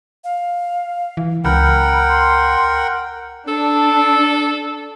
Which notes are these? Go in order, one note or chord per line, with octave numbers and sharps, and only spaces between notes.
F5
E3
C#2 A#4 F#5 G5 B5
C6
D4 A4